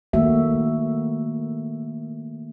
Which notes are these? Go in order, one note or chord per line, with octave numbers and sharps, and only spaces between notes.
D#3 A3 A#3 F#4 E5